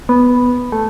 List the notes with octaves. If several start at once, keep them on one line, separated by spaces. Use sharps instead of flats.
B3
A3